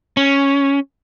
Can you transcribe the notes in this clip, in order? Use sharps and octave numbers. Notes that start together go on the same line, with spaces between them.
C#4